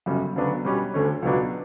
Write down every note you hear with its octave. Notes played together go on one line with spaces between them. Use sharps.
G1 F#2 C#3 G3
D2 C#3 F#3 B3 D4
B2 G3 C#4 G4 B4
D2 D3 A3 C#4
C#2 B2 F#3 B3 D4